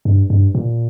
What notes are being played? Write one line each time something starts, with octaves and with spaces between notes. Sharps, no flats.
G2
G2
A#2